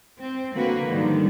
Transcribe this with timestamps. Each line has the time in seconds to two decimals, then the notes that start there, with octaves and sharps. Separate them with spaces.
0.19 C4
0.55 D3 A#3 F#4 B4
0.87 G#2 D3 D#3 F3 G3